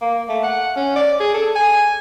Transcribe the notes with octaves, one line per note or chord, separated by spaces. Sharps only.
A#3
A3
F#5
C#4
D5
G#4
A4
G#5